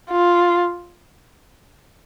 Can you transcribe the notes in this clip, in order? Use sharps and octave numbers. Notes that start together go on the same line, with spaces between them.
F4